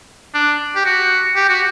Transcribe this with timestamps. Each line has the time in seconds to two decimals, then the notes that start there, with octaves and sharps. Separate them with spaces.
0.34 D4
0.76 G4
0.85 F#4
1.36 G4
1.49 F#4